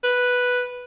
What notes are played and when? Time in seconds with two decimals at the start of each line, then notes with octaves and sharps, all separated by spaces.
0.03 B4